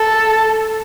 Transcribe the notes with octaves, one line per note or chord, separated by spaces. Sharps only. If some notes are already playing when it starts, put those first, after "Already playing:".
Already playing: A4